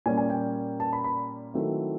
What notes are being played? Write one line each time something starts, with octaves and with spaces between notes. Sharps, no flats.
A#2 G3 A#3 C#4 G#5
G#5
G5
A5
B5
B5
D#3 F#3 A3 C4 E4